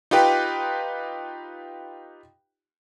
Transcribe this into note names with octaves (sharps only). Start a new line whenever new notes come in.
D#4 F4 G4 B4 G5